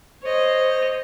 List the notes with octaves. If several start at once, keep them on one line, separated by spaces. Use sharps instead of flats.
C5 C#5 D#5